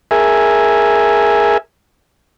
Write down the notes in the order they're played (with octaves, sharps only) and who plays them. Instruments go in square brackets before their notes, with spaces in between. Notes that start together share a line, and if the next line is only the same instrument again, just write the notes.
[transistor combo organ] G#4 A#4 E5 G#5